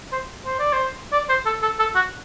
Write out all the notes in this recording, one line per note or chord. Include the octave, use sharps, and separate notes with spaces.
C5
C5
D5
C5
D5
C5
A4
A4
A4
F#4